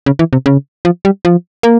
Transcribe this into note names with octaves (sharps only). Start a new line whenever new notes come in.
C#3
E3
C3
C#3
F3
G3
F3
A#3